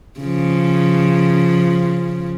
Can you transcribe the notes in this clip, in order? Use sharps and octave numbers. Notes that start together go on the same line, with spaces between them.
C#3 F3